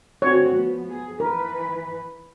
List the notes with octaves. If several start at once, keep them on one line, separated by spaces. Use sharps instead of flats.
D3 C4 F#4 C#5
F3 B3
G#4
E3 A#4 B4